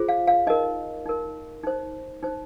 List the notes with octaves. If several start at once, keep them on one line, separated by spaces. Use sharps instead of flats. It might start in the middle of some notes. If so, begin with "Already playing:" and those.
Already playing: F4 G#4 C5
F5
F5
D#4 A#4 D#5
D#4 A#4
D#4 C5
D#4 C5